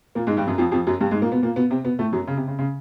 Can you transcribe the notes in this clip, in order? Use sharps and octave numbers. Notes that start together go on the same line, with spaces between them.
A#2 A#3
G#2 G#3
G2 G3
F#2 F#3
F2 F3
F2 F3
F#2 F#3
G2 G3
G#2 G#3
A#2 A#3
B2 B3
A#2 A#3
B2 B3
C3 C4
B2 B3
A2 A3
F#2 F#3
C#3
C3
C#3
C#3